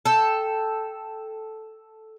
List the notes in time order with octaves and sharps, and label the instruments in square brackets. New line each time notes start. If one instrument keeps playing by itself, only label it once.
[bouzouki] A4 G5